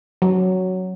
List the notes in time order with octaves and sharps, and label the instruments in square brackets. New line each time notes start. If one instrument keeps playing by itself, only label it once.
[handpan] F#3